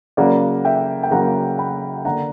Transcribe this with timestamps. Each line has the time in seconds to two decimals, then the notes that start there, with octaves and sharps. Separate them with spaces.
0.17 C#3 F#3 A#3 C#4 D5 F#5
0.65 E5 G5
1.03 G5
1.11 C#3 F#3 A#3 C#4 F#5 A#5
1.58 G5 B5
2.05 D3 A#3 D4 F#5 A#5